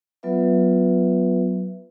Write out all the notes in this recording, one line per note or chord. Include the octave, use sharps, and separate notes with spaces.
F#3 B3 F4 B4 E5